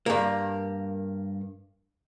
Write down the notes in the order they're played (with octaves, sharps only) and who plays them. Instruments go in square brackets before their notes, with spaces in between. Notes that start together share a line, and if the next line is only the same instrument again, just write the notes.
[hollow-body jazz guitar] G2 A#3